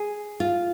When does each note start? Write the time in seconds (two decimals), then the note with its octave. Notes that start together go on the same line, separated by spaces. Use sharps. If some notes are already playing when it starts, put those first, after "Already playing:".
Already playing: G#4
0.40 F4